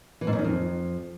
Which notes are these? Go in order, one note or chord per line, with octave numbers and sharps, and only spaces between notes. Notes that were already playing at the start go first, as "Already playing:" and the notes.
E3
G#2
F#2
D#3
F2